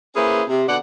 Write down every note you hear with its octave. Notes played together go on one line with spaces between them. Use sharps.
A#3 C#4 E4 G#4 B4 C5
C3
B2 D3 A4 D5 F#5